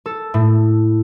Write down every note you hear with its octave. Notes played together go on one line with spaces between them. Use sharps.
A4
A2